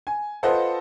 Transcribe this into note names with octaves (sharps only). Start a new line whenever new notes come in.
G#5
F4 A4 B4 C5 D#5 F#5